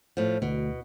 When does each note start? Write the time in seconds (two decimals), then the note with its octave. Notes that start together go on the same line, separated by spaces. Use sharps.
0.17 A2 F3
0.42 D2 B2